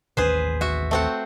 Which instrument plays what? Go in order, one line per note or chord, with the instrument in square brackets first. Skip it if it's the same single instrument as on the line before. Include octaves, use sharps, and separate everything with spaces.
[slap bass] A1 D#2 C#4 [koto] G#4 B4 C5
[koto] F#4 E5
A3 C4 F#5